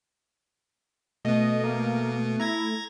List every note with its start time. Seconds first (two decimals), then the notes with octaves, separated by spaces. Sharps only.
1.25 B2 A3 B3 D#5
1.64 A#3
2.40 E4 A#5 G#6 A#6